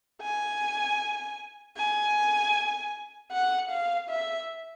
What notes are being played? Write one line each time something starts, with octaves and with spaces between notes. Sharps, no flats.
G#5
G#5
F#5
F5
E5